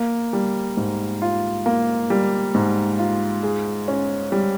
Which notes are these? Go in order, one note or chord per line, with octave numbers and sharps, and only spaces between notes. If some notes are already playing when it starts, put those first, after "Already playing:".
Already playing: A#3
G3
G#2
F4
A#3
G3
G#2
F4
G#4
C#4
G3